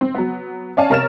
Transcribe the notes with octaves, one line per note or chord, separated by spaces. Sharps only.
C4
F#3 B3
C#4 C#5 D5 F5 G#5 A5
C3 A#4 C#5 F6 A6 E7